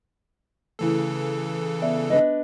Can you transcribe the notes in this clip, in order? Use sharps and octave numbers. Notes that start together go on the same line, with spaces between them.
C#3 E3 A3 E4 A4
B3 D5 E5
D4 B4 D#5